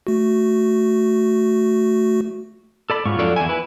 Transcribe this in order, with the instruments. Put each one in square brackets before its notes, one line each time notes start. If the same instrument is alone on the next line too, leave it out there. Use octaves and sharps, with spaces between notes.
[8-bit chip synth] A3 F#4
[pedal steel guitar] A4 D5 B5
[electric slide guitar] G#2 [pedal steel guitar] F#3 F4 C#6
[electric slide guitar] F2 A4 D5
[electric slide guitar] E2 G#5 [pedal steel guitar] E4
[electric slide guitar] B4